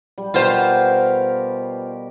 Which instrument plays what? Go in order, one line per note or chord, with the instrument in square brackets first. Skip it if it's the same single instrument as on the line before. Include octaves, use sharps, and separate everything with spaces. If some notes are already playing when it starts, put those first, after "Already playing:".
[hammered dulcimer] G3
[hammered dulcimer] B2 G4 A#4 [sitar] F4 C5